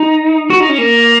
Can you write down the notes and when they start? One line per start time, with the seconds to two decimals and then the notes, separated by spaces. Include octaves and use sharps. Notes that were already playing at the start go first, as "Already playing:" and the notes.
Already playing: D#4
0.50 F#4
0.60 D#4
0.69 C#4
0.78 A#3